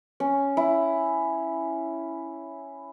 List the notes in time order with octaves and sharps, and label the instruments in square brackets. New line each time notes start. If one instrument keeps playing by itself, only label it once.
[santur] C#4
E4